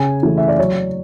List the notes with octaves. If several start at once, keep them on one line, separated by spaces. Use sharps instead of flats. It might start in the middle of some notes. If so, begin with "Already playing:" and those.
Already playing: C#3 G#5
E3 A3
E5
D5
F#3 C#5